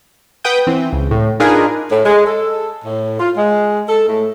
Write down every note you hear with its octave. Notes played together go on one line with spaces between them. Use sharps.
B4 F#5 G5 D#6 G6
E3 C4
C#2
A2
D4 D#4 F4 G#4 A#4 B4
A2
G#3
A4
A2
F4
G#3
A4
A2